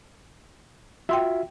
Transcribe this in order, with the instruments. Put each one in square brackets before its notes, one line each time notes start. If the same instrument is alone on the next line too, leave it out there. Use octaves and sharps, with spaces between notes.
[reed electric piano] F4 F#4 E5 [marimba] G5 C6 E6